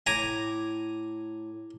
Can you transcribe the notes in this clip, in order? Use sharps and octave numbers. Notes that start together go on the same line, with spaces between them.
A2 G#5 A#5 D6